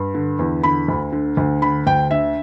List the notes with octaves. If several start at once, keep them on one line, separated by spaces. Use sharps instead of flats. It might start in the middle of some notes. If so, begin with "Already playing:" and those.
Already playing: G2
D3
E2
D3 B5
D2
D3
D2
D3 B5
D2 G5
D3 E5